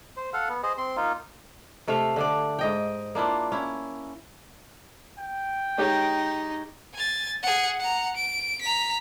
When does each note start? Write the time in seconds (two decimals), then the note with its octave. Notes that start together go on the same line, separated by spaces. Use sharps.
0.17 C5
0.33 A4 F5 F#5
0.49 B3
0.63 G#4 C5 D#5
0.78 C4 C6
0.96 A#3 D#4 F4
1.88 C3 A3 E5 F5
2.16 D3 D4 D5
2.59 G#2 D#5 G5
3.15 A#3 D4 E4 F4
3.52 C#4 E4
5.18 G5
5.78 G#3 D#4 G4 C#5
6.94 G#5 A6
7.43 G#4 F#5
7.79 F#5 A#5
8.16 D7
8.61 A#5 B6